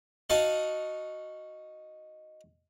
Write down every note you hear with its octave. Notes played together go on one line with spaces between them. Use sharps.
D#4 F#4 D#5 F5 A5